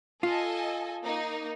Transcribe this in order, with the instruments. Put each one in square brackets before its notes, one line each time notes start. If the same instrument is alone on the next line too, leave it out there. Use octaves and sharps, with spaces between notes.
[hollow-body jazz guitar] F4 [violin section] A4 D#5 G#5
[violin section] A#3 D#4